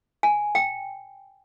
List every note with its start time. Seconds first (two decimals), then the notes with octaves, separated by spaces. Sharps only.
0.23 G#5
0.55 G5